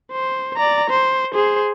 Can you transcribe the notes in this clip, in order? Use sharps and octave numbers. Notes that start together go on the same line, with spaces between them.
C5
D5 A#5
C5
G#4 C5